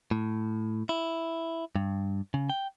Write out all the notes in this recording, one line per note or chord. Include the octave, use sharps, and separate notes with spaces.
A2
E4
G2
C#3
G5